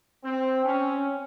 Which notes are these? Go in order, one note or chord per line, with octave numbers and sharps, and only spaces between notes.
C4
C#4